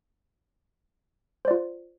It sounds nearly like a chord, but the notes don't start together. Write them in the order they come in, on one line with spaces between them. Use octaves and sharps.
C5 D5 F4